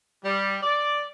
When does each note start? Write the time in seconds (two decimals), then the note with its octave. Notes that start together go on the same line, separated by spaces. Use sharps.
0.24 G3
0.63 D5